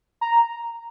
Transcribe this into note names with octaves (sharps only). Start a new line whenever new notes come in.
A#5